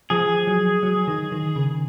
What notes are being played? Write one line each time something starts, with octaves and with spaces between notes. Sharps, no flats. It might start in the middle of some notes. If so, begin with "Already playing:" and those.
F3 G#4
F#3
F#3
D#3
D#3
C#3